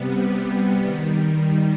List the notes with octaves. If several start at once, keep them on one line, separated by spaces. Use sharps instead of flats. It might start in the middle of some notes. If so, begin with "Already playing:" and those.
Already playing: C3 G3 B3
D#3 G3